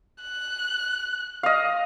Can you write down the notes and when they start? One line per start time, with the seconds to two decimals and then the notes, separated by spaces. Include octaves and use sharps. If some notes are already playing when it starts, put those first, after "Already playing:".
0.22 F#6
1.43 D#5 F5